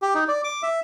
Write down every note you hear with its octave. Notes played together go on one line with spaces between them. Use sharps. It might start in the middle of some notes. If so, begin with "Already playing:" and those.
G4
D#4
D5
D6
E5